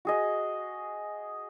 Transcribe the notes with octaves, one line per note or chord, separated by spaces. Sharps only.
F#4 G#4 D#5